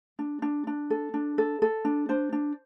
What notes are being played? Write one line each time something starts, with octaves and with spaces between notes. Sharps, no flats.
D4
D4
D4
A4
D4
A4
A4
D4
D4 C5
D4